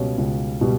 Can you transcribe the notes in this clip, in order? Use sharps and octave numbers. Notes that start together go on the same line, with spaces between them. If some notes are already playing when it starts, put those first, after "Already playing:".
Already playing: C#2 B2 G3 C#4
C#2
B2 G3